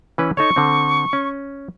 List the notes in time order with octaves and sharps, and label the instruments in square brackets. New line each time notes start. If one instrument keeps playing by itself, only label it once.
[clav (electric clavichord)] E3 C#4 B4
[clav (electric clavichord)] D#4 A4 C#5 [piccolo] C#6
[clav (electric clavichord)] D3 C4
C#4